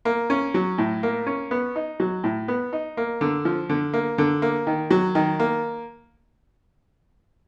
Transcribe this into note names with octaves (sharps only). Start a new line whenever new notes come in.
A#3
C#4
F#3
A2
A#3
C#4
B3
D#4
F#3
A2
B3
D#4
A#3
D3
F3
D3
A#3
D3
A#3
D#3
F#3
D#3
A#3